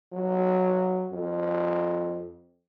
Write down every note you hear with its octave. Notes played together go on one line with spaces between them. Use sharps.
F#3
F2